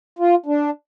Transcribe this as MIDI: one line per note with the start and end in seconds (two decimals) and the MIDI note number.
0.19 0.35 65
0.46 0.70 62